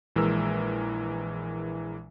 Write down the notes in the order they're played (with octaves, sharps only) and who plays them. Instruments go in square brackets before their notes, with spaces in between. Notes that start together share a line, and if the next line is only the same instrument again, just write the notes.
[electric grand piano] A#1 E3 G#3 A#4 E6